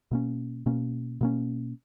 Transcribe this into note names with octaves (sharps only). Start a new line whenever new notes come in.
B2 A#3 C#4
B2 A#3 C#4
B2 A#3 C#4